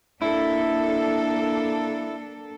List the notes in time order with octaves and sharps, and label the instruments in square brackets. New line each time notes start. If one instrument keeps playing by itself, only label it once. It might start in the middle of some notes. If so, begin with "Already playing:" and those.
[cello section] A#3 D4 A4 [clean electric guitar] E4